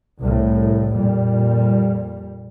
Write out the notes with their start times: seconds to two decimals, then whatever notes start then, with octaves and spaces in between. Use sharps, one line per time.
0.20 C2 A2
0.93 F2 A#2 G3